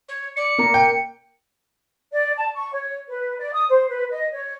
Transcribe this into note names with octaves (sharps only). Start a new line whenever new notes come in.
C#5
D5 C#7
A#3 A#5
G5
D5
A5
C#6
C#5
B4
D5
D#6
C5
B4
D#5
C#5